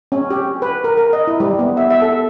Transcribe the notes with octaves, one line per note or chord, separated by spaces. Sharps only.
C#4
G4
B4
A#4
A#4
D#5
E4
G3
B3
E5
E5
A4